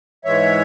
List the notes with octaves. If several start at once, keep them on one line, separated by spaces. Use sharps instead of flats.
G#2 E3 G#3 C#5 E5